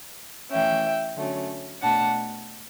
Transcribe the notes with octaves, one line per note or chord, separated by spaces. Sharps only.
E3 A3 C#4 E5 G5
D3 F#3 A3 C#4
B2 A3 D4 F#5 A5